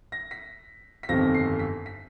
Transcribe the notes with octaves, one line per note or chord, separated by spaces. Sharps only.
A#6
B6
B6
G1 F2 C3 D#3 A#6
C7
B6
B6